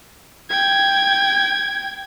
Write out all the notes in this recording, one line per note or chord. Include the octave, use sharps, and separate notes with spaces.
G5 G#6